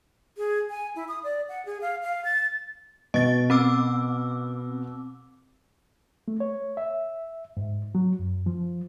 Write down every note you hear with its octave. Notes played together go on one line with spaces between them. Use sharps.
G#4
G#5
E4
D#6
D5
F#5
G#4
F5
F5
A6
B2 D#5 A6
C4 D6 E6
A3
C#5
E5
G#2
F#3
F#2
F3